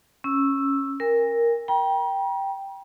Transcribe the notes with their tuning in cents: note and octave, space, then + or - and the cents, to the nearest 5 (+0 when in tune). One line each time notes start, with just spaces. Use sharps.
C#4 -10 E6 +0
A#4 +0 G#5 -45
G5 +0 A#5 +45